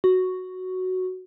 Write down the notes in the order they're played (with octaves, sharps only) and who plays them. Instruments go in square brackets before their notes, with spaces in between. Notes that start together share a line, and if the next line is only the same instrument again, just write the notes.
[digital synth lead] F#4